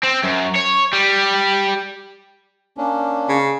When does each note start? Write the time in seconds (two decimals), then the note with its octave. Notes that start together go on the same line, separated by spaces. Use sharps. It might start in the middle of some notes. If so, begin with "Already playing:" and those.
0.04 C4
0.24 F#2
0.56 C#5
0.93 G3
2.78 A#3 C#4 D4
3.29 C#3